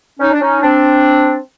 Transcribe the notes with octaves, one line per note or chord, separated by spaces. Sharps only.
C#4 D#4
D4
C#4 D#4
C4 D4